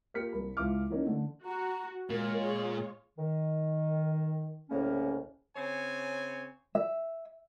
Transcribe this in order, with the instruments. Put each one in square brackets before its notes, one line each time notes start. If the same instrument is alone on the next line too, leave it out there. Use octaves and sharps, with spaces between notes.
[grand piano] A#3 F4 G4 F6 B6 C#7
C2 A#4 B5
C#2 E3 F4 E5 D6 F6
E3 A#3 C#4 D#4
D3 A3
[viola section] F#4 [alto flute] A#5
[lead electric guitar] A#2 [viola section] G#3 F4 C#5 [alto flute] A#4
[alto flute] G#4
[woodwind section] D#3
C2 A2 C#3 A#3 C#4
[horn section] C#3 C4 C#5 G#5
[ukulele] E5